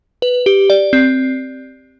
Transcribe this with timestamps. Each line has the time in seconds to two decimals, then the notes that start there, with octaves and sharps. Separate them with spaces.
0.22 B4
0.46 G4
0.70 D5
0.93 C4